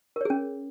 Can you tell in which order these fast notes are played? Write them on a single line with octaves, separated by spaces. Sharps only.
A#4 C#5 G#4 C#4